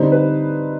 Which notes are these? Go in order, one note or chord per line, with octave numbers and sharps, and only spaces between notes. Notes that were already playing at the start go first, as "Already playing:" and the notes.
Already playing: D3 G3 C4 D#4 C5
B4